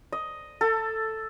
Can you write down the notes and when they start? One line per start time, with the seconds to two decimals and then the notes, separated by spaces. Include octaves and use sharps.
0.12 D#5
0.61 A4